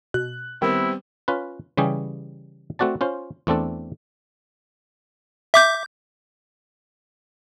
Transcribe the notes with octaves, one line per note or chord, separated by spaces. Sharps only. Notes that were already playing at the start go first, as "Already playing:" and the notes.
B2 F#6
D#3 G3 B3 C4 E4
C#4 F4 B4
C#3 E3 G3 C#4 G4 G#4
A3 C4 F#4 D5 A5
C#4 F4 C5
E2 A3 C4 D4 A4
E5 D6 G6